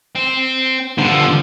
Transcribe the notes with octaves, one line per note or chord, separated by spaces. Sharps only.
C4
G2 A#2 D3 C5
F3